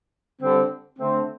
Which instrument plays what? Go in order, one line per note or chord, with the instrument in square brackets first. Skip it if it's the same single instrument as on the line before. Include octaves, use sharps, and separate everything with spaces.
[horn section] D3 G3 C4
D3 A3 C4